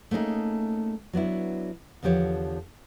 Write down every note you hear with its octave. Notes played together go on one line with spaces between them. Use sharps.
A3 A#3 C#4 D#4 G#4
F#3 B3 D4 E4
E2 D3 F3 G4 C#5